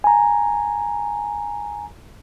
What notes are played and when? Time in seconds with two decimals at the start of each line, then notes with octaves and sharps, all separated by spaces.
0.04 G#5 A#5